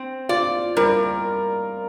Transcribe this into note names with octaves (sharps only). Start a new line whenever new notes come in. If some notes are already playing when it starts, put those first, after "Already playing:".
Already playing: C4
F4 D5
G3 A#4